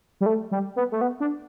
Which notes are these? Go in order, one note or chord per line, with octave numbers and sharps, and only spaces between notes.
G3
A3
G3
B3
A3
B3
D4